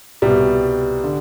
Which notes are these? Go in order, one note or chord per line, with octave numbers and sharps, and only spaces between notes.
C2 B2 G3
D3